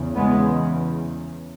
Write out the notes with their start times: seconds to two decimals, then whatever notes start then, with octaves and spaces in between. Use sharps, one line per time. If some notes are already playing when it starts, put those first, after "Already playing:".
Already playing: E2 C#3
0.16 G#3 B3